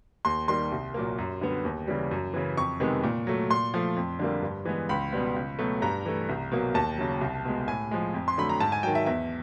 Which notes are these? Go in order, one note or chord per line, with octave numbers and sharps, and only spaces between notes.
D#2 C6
D#3 G3 A#3 C6
C2
A#2 F#3 A#3
F#2
D3 G3 B3
D#2
C#3 E3 G3
F#2
C#3 E3
F2 C#6
C3 D#3 G#3 B3
A#2
F#3 A3
A#2 C6
F3 A3
F2
D3 G3 A#3
G2
E3 G#3 B3
C#2 B5
B2 G3 B3
C#2
B2 F#3 A3
G2 A#5
E3 A3
C2
B2 F#3 A#3
D#2 A5
C#3 F#3
C2
B2 G#3
A2 G#5
F3 G#3
F2
C6
D3 F#3 A3 B5
A#5
G#2 A5
G#5
D#3 F#3 G5
E5
E2 E5